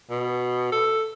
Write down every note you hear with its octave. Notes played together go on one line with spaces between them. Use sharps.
B2
A4